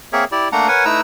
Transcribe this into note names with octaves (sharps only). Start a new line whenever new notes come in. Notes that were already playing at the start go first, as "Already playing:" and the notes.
A#3 C4 G#4 A#4 C#5 E5
E4 G4 D5
A3 A#3 D4 F#5 A#5
A#4 B4 C#5 F#5 G#5
A3 D#4 E4 B4 A#5 E6